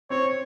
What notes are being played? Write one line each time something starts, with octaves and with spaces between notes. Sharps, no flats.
C4 C#5